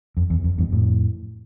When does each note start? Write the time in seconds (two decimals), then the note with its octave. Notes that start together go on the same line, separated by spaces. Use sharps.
0.17 F2
0.30 E2
0.44 F2
0.58 E2 G2
0.72 F2 A2